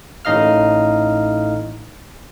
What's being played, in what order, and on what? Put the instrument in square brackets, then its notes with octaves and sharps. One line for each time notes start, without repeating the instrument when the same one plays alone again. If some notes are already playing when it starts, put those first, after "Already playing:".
[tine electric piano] A1 A2 D#4 D#5 F5 F6